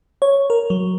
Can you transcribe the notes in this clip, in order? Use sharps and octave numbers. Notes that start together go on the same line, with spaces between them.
C#5
A#4
F#3